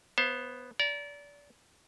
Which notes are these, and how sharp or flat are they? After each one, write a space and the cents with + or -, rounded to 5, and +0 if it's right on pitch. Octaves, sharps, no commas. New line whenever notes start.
B3 +0 C5 +25 F5 -10
D5 -30 A#5 +10